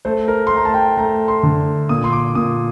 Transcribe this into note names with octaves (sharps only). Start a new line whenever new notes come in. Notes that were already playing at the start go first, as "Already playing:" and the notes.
A3 C5
A#4
C6
A3 A#5
A5
G5
A3 A#5
C6
D3
A#2 D#6
C6
D6
A#2 D#6